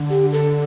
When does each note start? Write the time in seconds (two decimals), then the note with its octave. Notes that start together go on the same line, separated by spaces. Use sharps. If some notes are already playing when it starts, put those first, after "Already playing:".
Already playing: D3
0.10 G4
0.33 A4